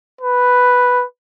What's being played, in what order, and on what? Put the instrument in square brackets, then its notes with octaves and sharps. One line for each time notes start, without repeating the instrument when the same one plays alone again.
[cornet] B4